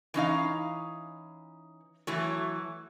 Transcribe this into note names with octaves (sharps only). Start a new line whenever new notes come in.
E3 C#4 D#4 F5
E3 F#3 A3